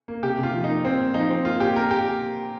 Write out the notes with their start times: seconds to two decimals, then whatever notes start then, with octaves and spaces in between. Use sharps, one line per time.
0.08 A#3
0.23 C3 G4
0.38 C3
0.43 F4
0.53 F3
0.64 A#3 D#4
0.84 A#2 C4
0.99 A#2
1.14 F3 D#4
1.30 C4
1.45 A#3 F4
1.60 A#2 G4
1.76 A#3 A#4
1.91 A#2 G4